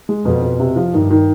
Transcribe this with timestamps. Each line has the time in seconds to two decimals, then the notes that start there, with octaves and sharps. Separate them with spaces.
0.09 G#3
0.25 F2 B2
0.42 B2
0.60 C3
0.76 F3
0.94 G2 D#3
1.10 D#3